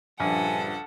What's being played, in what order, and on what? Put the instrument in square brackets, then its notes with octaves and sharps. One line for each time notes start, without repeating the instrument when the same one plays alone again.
[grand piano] A#1 [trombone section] G2 C#3 F3 [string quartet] A4 F#5 [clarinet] G#5